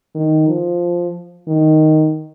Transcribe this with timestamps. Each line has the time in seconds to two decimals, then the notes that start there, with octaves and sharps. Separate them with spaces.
0.15 D#3
0.48 F3
1.48 D#3